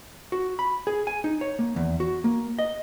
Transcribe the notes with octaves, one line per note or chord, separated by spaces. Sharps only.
F#4
B5
G#4
G#5
D#4
C#5
A#3
E2
F#4
A#3
D#5